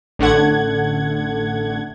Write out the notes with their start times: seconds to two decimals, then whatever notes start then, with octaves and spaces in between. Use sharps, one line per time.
0.19 A1 D3 A3 F#5 G#6